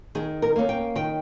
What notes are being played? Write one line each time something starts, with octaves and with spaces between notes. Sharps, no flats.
D#3 G#4
A#4
A#3 C#4
G5
D#3 G5